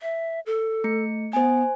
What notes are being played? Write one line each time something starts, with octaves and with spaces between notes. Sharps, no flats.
E5
A4
A3 C#7
B3 C5 G#5